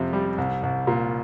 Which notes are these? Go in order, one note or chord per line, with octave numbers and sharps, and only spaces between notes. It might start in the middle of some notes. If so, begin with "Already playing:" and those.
Already playing: F2 C3
G3
C2
C2
A#2